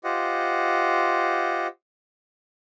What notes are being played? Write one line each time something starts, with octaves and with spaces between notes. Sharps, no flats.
F4 G4 C5 D#5 F#5